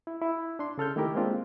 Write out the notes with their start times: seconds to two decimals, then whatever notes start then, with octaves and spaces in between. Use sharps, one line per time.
0.07 E4
0.21 E4
0.59 D4 C6
0.78 C#3 A4 F6 G6
0.96 D#3 A3 E4 G4 A#4
1.15 G#3 A#3 C4 D4 F4